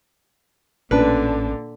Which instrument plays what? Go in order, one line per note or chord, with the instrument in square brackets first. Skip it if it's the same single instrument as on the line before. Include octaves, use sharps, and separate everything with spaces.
[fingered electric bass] A1 C#4 [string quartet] A#2 D3 [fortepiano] D4 B4